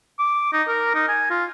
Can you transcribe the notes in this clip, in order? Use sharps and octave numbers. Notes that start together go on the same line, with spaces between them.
D6
D#4
A#4
D#4
G#5
F4